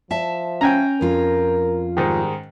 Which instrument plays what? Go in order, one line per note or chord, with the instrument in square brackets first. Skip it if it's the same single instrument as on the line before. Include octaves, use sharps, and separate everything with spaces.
[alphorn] F3 [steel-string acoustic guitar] E5 A5
[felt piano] C#4 [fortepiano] G5 G#5 A#5
[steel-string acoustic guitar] F2 F4 [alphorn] A#4
[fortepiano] G#2 D#3 [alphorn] G3